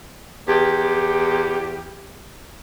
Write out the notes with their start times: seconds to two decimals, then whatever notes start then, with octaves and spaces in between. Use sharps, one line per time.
0.48 E2 G4